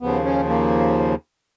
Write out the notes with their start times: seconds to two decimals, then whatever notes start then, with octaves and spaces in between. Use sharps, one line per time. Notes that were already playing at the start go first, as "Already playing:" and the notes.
0.01 D#2 C#3 F3 B3
0.25 C#4
0.49 A#3